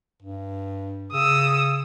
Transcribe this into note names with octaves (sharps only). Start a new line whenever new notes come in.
G2
C#3 D#6 E6